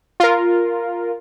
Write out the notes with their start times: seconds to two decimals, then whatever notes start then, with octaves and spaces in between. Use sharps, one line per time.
0.20 F4 A#4